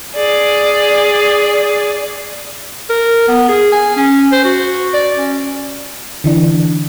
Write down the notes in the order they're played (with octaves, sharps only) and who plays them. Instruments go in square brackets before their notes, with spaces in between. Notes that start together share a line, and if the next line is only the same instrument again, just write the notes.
[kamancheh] G#4 D5
[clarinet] A#4
B3
G#4
G#5
C#4
C5
F#4
D5
C#4
[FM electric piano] D3 E3 D4